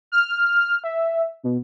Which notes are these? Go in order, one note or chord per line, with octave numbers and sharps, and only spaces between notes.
F6
E5
B2